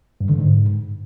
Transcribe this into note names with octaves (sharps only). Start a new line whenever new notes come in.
G2
D3
G#2